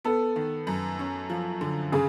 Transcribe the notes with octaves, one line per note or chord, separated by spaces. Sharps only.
B3 A4
D#3
F#2
C#4
F3
D3
C#3 G#4